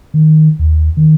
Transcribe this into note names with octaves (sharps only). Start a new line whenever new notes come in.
D#3
D#2
D#3